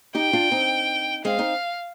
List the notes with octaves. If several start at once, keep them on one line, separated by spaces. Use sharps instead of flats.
D#4 G4 G5
D4 F4
C4 D#4
G#3 C4 F5
C4 D#4